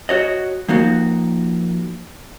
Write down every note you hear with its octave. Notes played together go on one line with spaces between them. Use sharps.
F#4 C#5 D#5
F3 A#3 D#4 F#4